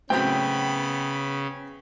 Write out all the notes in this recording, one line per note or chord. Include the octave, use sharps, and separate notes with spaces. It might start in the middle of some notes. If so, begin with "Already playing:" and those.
A2 C#3 F#3 B3 C4 G5 B5